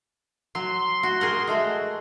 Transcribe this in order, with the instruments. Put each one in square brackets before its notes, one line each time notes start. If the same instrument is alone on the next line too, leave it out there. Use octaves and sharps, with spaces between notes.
[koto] F#3 [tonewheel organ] C6
[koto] F#4
G#4 A#4 F#5
G#3 A3 F#4